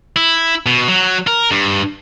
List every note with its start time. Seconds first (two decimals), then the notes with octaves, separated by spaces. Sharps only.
0.16 E4
0.66 B2
0.88 F#3
1.27 A#4
1.51 G2